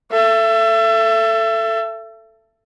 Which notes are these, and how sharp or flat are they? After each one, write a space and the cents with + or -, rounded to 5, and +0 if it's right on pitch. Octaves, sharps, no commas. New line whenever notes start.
A4 +10 E5 +35